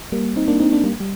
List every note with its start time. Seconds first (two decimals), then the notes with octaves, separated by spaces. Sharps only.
0.12 G3 A#3
0.36 C4 D#4
0.48 A#3 D4
0.60 C4 D#4
0.72 A#3 D4
0.84 G3 A#3
1.00 G3